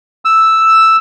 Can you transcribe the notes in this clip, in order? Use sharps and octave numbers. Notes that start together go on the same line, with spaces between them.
E6